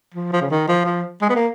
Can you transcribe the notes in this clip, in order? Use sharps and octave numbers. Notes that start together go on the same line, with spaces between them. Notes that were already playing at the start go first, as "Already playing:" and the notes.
F3
F3
C#3
D#3
F3
F3
G#3
B3
A#3